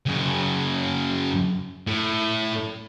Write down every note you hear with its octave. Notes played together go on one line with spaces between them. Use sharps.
F#2 C#3
A2